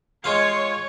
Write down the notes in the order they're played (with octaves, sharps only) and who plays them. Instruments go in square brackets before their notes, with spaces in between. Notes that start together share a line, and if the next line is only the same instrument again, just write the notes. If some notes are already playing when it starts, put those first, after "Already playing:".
[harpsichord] G#3 F4 F5 [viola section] C#5